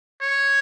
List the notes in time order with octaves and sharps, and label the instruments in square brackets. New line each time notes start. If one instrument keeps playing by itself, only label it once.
[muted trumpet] C#5